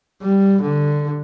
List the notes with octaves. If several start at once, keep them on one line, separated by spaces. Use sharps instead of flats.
G3
D3